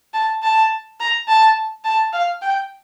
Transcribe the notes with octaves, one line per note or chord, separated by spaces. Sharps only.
A5
A5
A#5
A5
A5
F5
G5